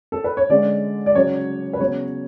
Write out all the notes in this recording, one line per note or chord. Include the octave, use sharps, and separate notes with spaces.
A4
B4
C#5
D3 G#3 C#4 D5
D5
C#3 F#3 C#4 C#5
B4
C#3 F#3 B3 C#5